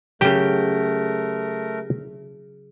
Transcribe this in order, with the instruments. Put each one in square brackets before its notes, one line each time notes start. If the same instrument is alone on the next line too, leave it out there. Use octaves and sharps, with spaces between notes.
[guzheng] C#3 F#3 [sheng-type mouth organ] A3 A#4 [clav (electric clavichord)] G4 G5